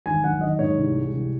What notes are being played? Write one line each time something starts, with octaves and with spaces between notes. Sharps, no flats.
G#1 G#5
F#3 F#5
D#3 D#5
G#2 C#5
C2
G#3
C2